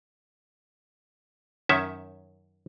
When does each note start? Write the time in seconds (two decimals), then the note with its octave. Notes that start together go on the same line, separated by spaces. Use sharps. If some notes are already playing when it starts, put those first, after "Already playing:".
1.69 F#2 D#3 C#4 E5